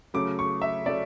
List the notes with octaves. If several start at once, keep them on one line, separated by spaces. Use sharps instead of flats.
C#3 F#3 A3 C#4 D6
C#6
E5
C#3 F#3 A3 C#4 D5